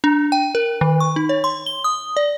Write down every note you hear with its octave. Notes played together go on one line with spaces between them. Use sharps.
D4
G5
A#4
D#3
C#6
D#4
C#5
C6
G7
D#6
D5